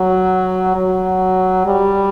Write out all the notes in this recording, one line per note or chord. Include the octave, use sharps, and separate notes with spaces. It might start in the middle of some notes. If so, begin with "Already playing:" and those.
Already playing: F#3
F#3
G3